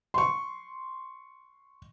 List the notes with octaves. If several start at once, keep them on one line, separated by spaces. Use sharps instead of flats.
C6 C#6